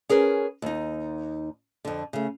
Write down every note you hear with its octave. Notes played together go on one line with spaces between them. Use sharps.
C#4 G#4 A#4 B4
D#2 D#4
F2 D3
C#3 A3